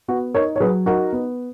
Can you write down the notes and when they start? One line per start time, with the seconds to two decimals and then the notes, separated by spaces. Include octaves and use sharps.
0.08 B3 F#4
0.35 D#4 A#4 C#5
0.56 C#5
0.60 F#3 G#4 B4
0.86 D#4 F#4 A#4
1.13 B3